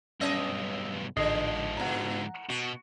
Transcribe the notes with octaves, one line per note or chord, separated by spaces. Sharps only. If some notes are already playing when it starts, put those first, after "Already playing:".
B1 G2 C#4 D#5 E5
A1 G#2 D3 F3 D#5 C7
B2 D3 F#5 A#5
B2 F#4